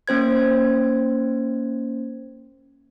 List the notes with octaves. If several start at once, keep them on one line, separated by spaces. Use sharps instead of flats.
A#3 C#4 C5 G#6